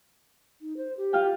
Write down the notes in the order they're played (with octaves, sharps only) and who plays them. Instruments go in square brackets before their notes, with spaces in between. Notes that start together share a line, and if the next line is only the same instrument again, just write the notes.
[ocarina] D#4
C5
G4
[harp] F4 F5 G5